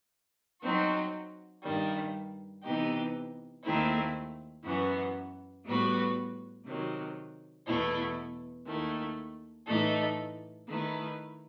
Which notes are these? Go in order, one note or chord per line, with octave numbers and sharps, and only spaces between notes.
F#3 C4 D#4 F#4
G2 D#3 G3
C3 E3 B3 D#4 G4
D#2 D#3 A3 C4 E4
F#2 E3 B3 F#4
A2 G3 B3 F#4 B4
C3 D#3 F#3
E2 B2 A3 E4
D#2 D#3 A3 E4
A2 E3 A3 D#4 A4
D#3 A3 E4 B4